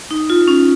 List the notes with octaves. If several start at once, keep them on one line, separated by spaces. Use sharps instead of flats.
D#4
F4
C#4